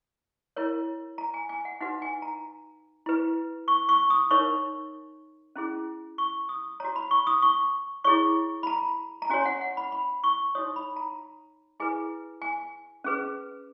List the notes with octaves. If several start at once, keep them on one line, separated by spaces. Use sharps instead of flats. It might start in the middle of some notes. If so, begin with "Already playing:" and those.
E4 A#4 C#5
A#5
G#5
G#5
F#5
D#4 F#4 B4 F#5
G#5
A#5
E4 B4
C#6
C#6
D#6
D#4 A#4 C#5 C#6
C#4 E4 G#4
C#6
D#6
F#4 C#5 A#5
B5
C#6
D#6
C#6
E4 G#4 C#5 C#6
B5
A#5
A#5
C#4 F#4 C#5 G#5
F#5
F#5
B5
B5
C#6
D#4 F#4 C#5 D#6
B5
A#5
E4 G#4 B4 G#5
G#5
C#4 G#4 B4